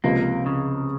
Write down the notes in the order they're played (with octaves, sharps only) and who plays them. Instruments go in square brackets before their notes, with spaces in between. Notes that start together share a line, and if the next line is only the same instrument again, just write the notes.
[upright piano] C#2 C3 F3 [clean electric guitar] A#3
[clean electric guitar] C#3